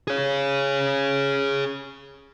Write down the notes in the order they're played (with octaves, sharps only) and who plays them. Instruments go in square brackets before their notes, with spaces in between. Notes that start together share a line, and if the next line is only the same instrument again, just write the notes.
[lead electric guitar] G#4 C#5